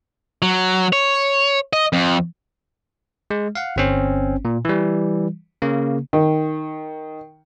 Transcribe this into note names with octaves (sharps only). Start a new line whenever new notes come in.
F#3
C#5
D#5
F2
G#3
F5 F#5
G1 C4 C#4
A#2
E3 G3
C#3 A#3
D#3